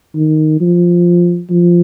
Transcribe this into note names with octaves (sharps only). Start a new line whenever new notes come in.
D#3
F3
F3